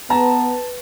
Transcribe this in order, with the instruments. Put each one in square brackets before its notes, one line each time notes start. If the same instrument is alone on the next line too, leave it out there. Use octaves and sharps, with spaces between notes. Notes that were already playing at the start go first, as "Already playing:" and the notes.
[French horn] B3 [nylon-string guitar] B4 [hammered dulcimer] A5 [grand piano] A#5